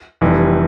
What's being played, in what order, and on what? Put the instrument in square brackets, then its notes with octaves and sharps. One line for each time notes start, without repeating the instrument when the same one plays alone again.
[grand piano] F1 F2 E3 G3